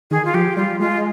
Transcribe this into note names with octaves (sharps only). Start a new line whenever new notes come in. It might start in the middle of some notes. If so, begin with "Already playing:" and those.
D#3 G#4
F4
F3 G4
G3 F4
G#3 F4